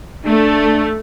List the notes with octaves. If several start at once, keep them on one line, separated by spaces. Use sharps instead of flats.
A3 D4